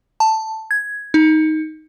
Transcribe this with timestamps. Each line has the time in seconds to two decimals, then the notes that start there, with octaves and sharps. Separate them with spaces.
0.20 A5
0.71 G#6
1.14 D#4